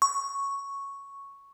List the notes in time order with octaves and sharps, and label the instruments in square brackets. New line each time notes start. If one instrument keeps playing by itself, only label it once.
[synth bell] C#6